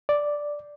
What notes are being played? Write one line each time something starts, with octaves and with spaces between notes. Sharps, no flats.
D5